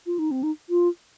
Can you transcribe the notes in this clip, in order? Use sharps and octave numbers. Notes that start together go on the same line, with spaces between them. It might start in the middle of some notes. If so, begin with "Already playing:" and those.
F4
D#4
C4
D#4
F4